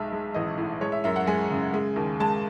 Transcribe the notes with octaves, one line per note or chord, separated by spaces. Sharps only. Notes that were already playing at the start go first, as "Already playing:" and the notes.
Already playing: B1 G#3 E5
G#3
A1 D#5
A2
G#3 C#5
E5
F#2 E5
F#5
G#3 G#5
C#3
G#3
D#2
G#3 A5